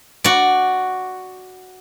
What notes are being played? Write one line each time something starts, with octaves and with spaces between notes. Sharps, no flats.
F#4 D5